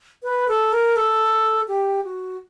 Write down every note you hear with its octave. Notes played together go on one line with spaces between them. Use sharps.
B4
A4
A#4
A4
G4
F#4